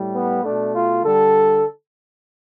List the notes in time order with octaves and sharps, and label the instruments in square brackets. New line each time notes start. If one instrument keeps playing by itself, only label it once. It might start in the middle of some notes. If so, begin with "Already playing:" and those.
Already playing: [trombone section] A2 G3
B3
B2 A3 D4
F4
D3 G3 A4